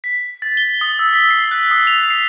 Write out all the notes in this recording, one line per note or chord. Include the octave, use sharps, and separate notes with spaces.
B6
A6
G7
D#6
E6
B6
C7
F#6
D#6
F7
C7